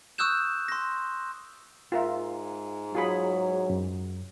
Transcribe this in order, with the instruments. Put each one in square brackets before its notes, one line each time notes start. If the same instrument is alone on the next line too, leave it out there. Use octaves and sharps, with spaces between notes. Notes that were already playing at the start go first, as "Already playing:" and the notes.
[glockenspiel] C#6 D#6 E6 F#6 G6 E7
C6 A#6
[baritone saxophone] G#2 [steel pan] F4 A#4 E5
[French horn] F#3 [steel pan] F4 G#4 B5
[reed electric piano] F#2